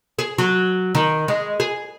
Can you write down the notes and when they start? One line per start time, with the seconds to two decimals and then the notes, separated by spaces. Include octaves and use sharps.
0.19 G#4
0.38 F#3
0.95 D#3
1.28 G#3
1.60 G#4